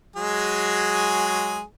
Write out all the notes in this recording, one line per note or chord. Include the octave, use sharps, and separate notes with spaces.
F#3 G#3 G#4